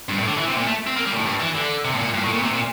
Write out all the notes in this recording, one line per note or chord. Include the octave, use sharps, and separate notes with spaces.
G2
A2
D3
E3
C3
A#2
A3
C4
A#3
G3
A#2
A2
G2
E3
D3
C3
A2
A#2
G2
A2
A#2
C3
A#2